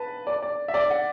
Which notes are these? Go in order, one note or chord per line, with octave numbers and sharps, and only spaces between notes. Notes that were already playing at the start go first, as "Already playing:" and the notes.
Already playing: B4 A5
D5
D5
E5
D5
F#5